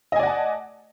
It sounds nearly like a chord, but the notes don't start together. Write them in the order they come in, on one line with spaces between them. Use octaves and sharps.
D#5 G#5 D5 F#5 A5